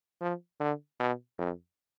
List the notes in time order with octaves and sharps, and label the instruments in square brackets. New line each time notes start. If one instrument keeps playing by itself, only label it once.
[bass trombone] F3
D3
B2
F2